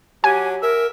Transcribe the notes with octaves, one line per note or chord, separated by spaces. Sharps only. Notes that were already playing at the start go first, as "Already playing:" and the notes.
F#3 G4 G#5
A#4 E5